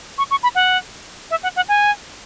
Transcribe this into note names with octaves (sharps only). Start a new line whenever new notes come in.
C#6
C#6
B5
F#5
E5
F#5
F#5
G#5